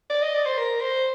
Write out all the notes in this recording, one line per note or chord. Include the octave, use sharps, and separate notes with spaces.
D5
D#5
D5
C5
A#4
C5